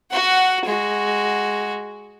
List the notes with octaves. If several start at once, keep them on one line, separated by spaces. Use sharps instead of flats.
F#4 F#5
G#3 F#4